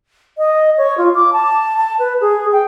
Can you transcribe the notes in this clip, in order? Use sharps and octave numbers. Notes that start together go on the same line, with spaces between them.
D#5
C#5
F4
D6
A5
A5
B4
G#4
G5